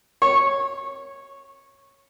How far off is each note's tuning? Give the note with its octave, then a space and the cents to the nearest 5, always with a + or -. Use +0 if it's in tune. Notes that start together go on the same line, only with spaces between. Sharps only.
C#5 -10